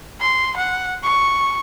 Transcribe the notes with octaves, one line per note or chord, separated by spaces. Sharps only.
C6
F#5
C#6